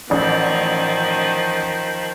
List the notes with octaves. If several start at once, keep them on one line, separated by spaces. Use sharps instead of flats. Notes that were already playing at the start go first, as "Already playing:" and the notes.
A1 D#3 F3 D5